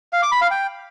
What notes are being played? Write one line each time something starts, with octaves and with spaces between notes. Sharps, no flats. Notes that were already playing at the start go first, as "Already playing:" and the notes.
F5
D6
B5
F5
G5